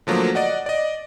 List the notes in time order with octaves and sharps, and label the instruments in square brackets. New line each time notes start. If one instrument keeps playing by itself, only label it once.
[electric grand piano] D3 F3 F#3 A3 A#3
D5 D#5 F#5
D5 D#5